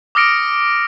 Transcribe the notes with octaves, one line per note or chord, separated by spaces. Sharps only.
D6 D#6 F6 A#6 C#7 D7